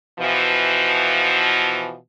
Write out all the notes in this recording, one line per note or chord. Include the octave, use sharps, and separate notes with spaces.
B2 E3 F3